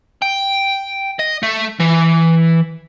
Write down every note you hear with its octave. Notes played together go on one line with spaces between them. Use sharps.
G5
D#5
A3
E3